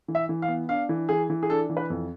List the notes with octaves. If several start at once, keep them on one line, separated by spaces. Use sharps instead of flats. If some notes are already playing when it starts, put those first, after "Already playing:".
E3
E5
E3
F5
B3
D4 F5
E3
E3 G#4
E3
G#4
D4 A4
E3
B4
F2